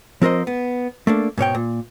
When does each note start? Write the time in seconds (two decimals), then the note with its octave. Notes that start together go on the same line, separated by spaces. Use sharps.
0.22 F3 C4 A#4 C5 D#5
0.47 B3
1.07 A3 A#3 D4
1.38 G#2 B2 C#5 G5
1.55 A#2